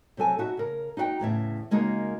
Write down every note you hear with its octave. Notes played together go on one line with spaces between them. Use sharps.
C3 F#3 A4 G#5
D#4 F#4 E5
C#3 A#4
D#4 F#4 E5 G5
E2 A2 C#3 E5
C#3 G#3 A#3 D#4 F#4 A#4